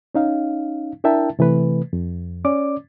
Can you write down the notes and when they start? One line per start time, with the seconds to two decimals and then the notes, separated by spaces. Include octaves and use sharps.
0.15 C#4 D#4 F5
1.04 D4 E4 A#4 E5 G5 A5
1.39 C3 E3 A3 B4
1.93 F2
2.44 C#4 D5 D6